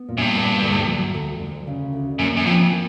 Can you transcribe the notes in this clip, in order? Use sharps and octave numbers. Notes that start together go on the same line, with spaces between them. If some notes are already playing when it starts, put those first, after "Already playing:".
Already playing: B3
A#2
F#2
G2
A#2
D2
F#3
D2
D2
C#3
D2
F#2 A#3
F#2
F2 F3
A#3